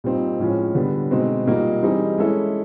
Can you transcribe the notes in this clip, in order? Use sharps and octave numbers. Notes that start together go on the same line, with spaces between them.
A#2 G3 C4 D#4
A2 F3 G#3 C#4 F4
D3 G3 B3
B2 G#3 C4 D#4
A#2 G3 A#3 D#4 F#4
E3 G3 C4 D#4 G#4
G#3 C#4 E4 A4